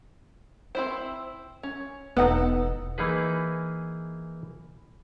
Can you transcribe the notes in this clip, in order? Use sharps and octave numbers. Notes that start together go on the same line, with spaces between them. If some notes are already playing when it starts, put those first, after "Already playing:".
C4 E4 C5
C#4
E1 B3 D#4 A4 F#5
E3 A#3 D#4 G#4 B4